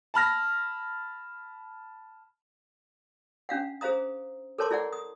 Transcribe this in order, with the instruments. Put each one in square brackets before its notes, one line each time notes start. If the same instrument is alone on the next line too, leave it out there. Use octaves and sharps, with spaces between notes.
[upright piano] A5 B5 F6 A#6
[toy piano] C#4 D4 F5 F#5
G#4 C5 F5 A#5 D#6
A4 A#4 C#5 A5 C6 D6
E4 G#4 D5 F#5
D#6